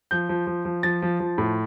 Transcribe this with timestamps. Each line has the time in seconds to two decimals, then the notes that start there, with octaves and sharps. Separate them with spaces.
0.11 F3 G6
0.29 F3
0.47 F3
0.65 F3
0.83 F3 A6
1.02 F3
1.20 F3
1.38 A2